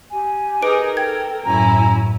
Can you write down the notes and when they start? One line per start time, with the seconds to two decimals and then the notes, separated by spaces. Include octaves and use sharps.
0.11 G4 G#5
0.62 D#4 G#4 A#4 B4 D6 D7
0.97 A4 A#4 G5 G#6
1.45 F#2 A2 C#4 E4 G#5 A#5